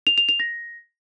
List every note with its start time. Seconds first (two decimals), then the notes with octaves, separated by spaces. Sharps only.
0.07 F7
0.18 F7
0.29 F7
0.40 A#6